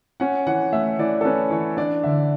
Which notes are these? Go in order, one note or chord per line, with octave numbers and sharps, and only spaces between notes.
C#4 F#5
E3 F#5
A3 E5
E3 D5
A4
C#4 B4
E3 C#5
D4 D5
D3 E5